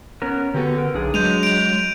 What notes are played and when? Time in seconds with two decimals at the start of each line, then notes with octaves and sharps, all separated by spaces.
0.22 B3 C#4 A#4
0.54 D3 B3 F#4 G4 B4
0.78 A#4
0.95 B1 D4 G#4
1.14 F#3 G#3 G6 D#7 F7
1.43 D7 F7